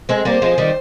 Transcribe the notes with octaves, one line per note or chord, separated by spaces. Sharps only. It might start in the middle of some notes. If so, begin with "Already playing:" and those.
G#3 C4
G3 A#3 C5
F3 G#3
D#3 G3